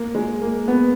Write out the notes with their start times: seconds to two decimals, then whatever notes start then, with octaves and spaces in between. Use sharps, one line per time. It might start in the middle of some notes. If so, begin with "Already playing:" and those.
Already playing: A#3
0.15 G#3
0.42 A#3
0.68 B3